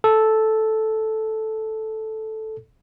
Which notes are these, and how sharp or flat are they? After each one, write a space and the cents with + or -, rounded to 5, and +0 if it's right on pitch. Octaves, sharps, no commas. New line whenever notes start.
A4 -5